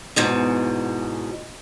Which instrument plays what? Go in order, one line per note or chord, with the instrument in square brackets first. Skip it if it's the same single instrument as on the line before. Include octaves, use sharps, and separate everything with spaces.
[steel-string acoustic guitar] E2 G#2 B2